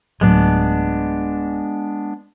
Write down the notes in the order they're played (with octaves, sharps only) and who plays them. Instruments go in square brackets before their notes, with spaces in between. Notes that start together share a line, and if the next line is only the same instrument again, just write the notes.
[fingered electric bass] D1 A2 F#3 [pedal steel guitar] G#3 B3 D4